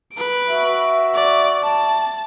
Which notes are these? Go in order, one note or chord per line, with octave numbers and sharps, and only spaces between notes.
B4 D7
F#4 E5
D5
A5